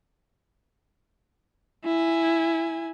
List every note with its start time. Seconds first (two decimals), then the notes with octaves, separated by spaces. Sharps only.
1.85 E4 G#5